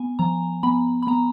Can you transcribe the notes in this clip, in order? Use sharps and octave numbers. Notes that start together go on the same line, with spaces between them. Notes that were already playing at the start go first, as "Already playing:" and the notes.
Already playing: B3 G#5
F3 A#5
B3 B5
B5
B3 A#5